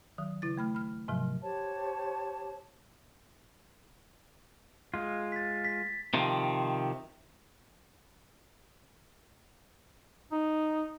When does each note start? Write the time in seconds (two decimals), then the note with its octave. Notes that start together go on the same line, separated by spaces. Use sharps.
0.18 D#3 F#3
0.42 C#3 E4 A6
0.58 A3 B5 F6
0.75 B5 F6
1.08 G#2 C3 F3 F#3
1.42 G4 C5 C#5 A5
4.94 G#3 F4
5.32 A6 B6
5.65 B6
6.14 C3 D#3 F3
10.32 D#4